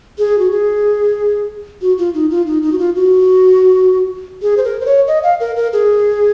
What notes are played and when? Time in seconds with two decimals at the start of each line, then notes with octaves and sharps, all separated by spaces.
0.18 G#4
0.39 F#4
0.51 G#4
1.81 F#4
1.98 F4
2.14 D#4
2.31 F4
2.47 D#4
2.62 D#4
2.72 F#4
2.79 F4
2.96 F#4
4.42 G#4
4.57 C5
4.64 A#4
4.81 C5
4.86 C#5
5.07 D#5
5.23 F5
5.40 A#4
5.56 A#4
5.73 G#4